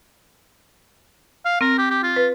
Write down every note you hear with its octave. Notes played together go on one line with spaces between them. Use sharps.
F5
C4 A#4
G4
G4
F4
B4